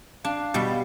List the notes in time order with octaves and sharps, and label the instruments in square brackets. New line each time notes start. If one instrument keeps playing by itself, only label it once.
[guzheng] D4 [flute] F5
[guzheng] B2 G3